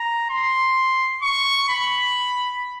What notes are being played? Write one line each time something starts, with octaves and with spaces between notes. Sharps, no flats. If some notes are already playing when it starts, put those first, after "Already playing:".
Already playing: A#5
C6
C#6
B5